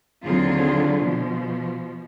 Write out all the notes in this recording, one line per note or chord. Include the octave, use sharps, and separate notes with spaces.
D#2 D3 F#3 C4 F4 G#4
B2 F3